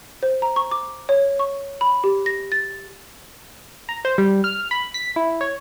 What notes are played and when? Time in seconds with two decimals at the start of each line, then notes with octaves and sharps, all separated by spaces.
0.23 C5
0.42 A#5
0.56 C#6
0.71 D6
1.09 C#5
1.39 C#6
1.81 B5
2.04 G4
2.26 A#6
2.52 A6
3.89 A#5
4.05 C5
4.18 G3
4.44 F6
4.71 B5
4.94 B6
5.16 E4
5.41 C#5